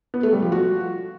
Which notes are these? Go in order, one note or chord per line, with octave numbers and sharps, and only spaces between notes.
B3
A3
G3
F3
F#4